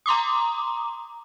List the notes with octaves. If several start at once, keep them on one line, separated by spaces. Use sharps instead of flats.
A#5 C6 D6 D#6